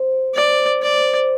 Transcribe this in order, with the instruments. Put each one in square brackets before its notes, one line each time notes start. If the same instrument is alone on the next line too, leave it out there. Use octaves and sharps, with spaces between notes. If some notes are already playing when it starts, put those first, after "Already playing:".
Already playing: [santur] C4 C5
G4
[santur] C4 [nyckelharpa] D5
[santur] G4
[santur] C5 [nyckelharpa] D5
[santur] C5